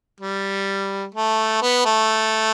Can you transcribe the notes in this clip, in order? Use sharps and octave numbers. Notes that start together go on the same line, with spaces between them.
G3
A3
B3
A3